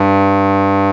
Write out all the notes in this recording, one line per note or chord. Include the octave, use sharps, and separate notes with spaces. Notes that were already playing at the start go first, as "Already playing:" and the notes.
Already playing: G2